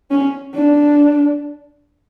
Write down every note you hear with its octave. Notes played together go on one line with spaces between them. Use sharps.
C#4
D4